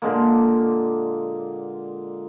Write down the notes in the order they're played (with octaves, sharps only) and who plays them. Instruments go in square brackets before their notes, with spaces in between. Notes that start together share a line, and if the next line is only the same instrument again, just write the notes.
[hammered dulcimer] A#2 D3 G#3 A#3